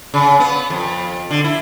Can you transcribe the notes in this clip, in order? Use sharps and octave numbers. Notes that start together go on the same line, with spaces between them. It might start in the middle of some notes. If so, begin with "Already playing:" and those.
C#3
B3
F2
D3
E4